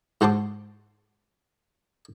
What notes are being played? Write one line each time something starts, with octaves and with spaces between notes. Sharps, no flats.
G#2 F#4 C5 A5 C6 D6